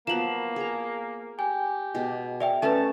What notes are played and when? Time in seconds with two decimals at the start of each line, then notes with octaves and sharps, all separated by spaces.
0.07 F3 F#3 A#3 B3 E7 F#7
0.56 G#4 A#5
1.39 G4 G#5
1.94 B2 G#3
2.40 A#4 D5 E5 G5
2.62 A3 C#4 A4 B4 A5